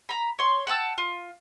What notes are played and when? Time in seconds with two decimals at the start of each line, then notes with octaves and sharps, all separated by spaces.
0.09 A#5 B5
0.39 C#5 C6
0.67 F#5 G5 A5 E6
0.98 F4